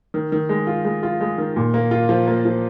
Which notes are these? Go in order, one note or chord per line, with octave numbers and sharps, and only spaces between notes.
D#3
D#3
G#3
F4
G#3
F4
G#3
D#3
A#2
A#3
F4
F3
A#3
F3